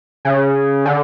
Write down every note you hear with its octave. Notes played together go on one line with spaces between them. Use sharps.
C#3
D3